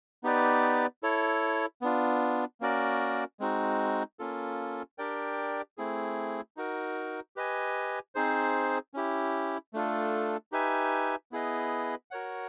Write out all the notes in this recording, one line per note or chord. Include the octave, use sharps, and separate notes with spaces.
B3 D#4 G4 B4 D5
E4 A4 C#5
B3 D4 F4
A#3 C#4 F#4 A#4 D5
G#3 C4 D#4 F#4
A#3 C#4 F4 A4
D4 G4 A#4 D5 G5
A3 C4 E4 G#4
D#4 F#4 A#4
G4 B4 D#5 G#5
C4 D#4 G#4 C5
C#4 E4 G4
A3 D4 F4 A4
D#4 G4 B4 E5 G#5
B3 E4 G#4 B4 D#5
F#4 A#4 C#5 F#5